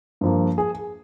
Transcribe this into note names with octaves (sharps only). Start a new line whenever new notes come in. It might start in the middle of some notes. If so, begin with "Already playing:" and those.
G2 F3 A#3
G#4